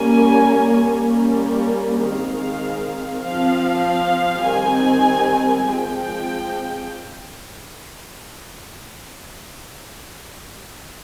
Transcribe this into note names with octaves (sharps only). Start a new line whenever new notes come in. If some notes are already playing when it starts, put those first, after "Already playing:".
Already playing: G3 A#3 C#4 G#5
G3 A#3 C#4
D#3 G#3 C4 F5
F3 C4 F5
D#3 G3 C4 G#5
F3 G#3 C4 G5